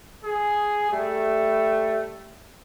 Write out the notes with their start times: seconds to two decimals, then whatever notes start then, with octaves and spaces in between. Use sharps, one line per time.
0.24 G#4
0.90 G3 A3